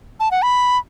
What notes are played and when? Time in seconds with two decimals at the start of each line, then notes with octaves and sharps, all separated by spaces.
0.20 A5
0.31 F#5
0.42 B5